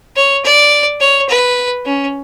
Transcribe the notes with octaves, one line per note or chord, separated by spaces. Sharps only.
C#5
D5
C#5
B4
C#4